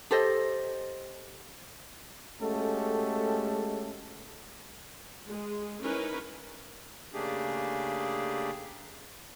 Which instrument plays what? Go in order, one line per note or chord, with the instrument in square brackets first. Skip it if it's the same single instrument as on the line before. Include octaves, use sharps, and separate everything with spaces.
[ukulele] G4 A4 C5 D#5
[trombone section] G#3 A3 C#4 F#4 G4 A4
[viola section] G#3
C#4 D#4 E4 A#4 B4
[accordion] C#3 A3 A#3 D4 G4 G#4